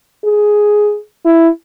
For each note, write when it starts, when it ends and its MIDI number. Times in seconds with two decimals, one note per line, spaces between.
0.24 0.99 68
1.25 1.48 64